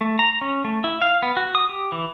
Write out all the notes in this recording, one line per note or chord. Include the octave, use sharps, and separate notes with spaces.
A3
A#5
C#4
A3
E4
F5
B3
F#4
D#6
G4
E3